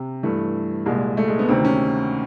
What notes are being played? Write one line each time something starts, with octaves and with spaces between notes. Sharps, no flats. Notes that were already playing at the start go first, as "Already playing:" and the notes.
Already playing: C3
G2 E3 A3
C2 A#2 G#3
A3
G#3
B3
D2 C3 D#3 C4
C#4